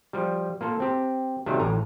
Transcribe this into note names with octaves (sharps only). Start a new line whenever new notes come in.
F3 G3
A#3 F4 A4
C4 G4
C3 D#3 F#3 G3 A3 C#4
A1 A2 G#5 A#5